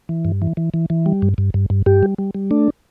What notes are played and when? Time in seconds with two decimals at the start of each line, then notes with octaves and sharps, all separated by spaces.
0.09 E3
0.25 G2
0.42 E3
0.57 E3
0.74 E3
0.90 E3
1.06 G3
1.22 G2
1.38 G2
1.54 G2
1.70 G2
1.86 G2 G4
2.03 G3
2.18 G3
2.35 G3
2.51 A3 D4